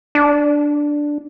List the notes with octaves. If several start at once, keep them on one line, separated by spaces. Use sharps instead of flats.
D4